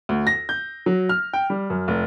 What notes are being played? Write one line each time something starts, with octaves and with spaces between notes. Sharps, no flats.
D2
A#6
G6
F#3
F6
G5
G3
F#2
F1